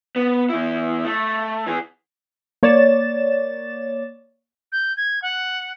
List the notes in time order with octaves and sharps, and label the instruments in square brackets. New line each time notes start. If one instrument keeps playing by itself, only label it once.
[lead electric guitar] B3
E2 E4
A3
E3 G#4
[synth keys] A#3 C#5 D5 A6 E7
[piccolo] G6
G#6
F#5